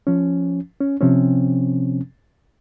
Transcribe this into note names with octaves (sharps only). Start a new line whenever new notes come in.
F3 C#4
C#4
C3 F3 C4 C#4